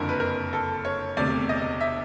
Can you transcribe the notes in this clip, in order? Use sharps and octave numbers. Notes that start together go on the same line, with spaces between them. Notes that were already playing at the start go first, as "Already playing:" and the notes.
Already playing: F#1 F2 D3 A#4
B4
A#4
A4
C#5
E1 D2 C3 D5
D#5
E5